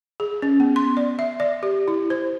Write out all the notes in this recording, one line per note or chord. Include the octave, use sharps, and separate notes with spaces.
G#4
C#4
B3
C6
D5
E5
D5
G4
E4
C5